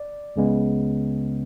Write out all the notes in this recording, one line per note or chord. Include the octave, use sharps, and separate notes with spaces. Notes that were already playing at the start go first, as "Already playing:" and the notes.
Already playing: D5
C#2 C#3 G#3 B3